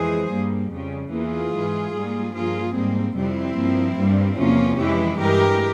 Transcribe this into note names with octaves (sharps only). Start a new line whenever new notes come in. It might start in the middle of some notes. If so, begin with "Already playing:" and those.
Already playing: F2 E3 G#3 G#4 C5
G2 G3 A#3
F2 C#3 G3
E2 E3 A#3 F4 G#4
G#2 E3 G#3
G#2 G3 A#3
G2 F3 A#3 F4 G#4
G#2 G3 A#3 C4
F2 C3 G3 C4 E4
G2 F3 A#3
G2 G3 A#3
E2 C3 F3 A#3 C#4 F4
F2 E3 G#3 E4 G4
G2 E3 G#3 G4 A#4